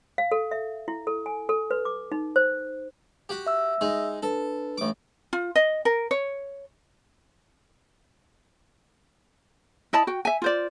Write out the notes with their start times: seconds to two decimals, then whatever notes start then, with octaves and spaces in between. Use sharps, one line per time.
0.18 F5
0.32 A4
0.51 E5
0.88 E4
1.07 A4
1.26 G#5
1.49 A4
1.71 B4
1.85 D6
2.12 D#4
2.36 C5
3.29 F#4 G4
3.47 E5 E6
3.81 G#3 D#4
4.23 D4 A4 B4
4.78 A1 D6
5.33 F4
5.55 D#5
5.85 A#4
6.11 C#5
9.93 E4 D#5 A5 B5
10.07 F#4 G5
10.25 E5 G#5
10.42 F4 C5 D5